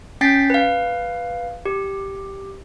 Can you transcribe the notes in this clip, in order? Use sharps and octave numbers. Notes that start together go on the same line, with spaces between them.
C#4 G5 G6 A6 B6 C7
B4 F5
G4